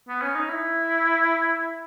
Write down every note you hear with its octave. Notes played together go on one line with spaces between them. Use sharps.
B3
C#4
D#4
E4